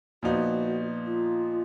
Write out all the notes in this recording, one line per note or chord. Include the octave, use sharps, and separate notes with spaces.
A#2 F3 B3 D#4 F#4
F4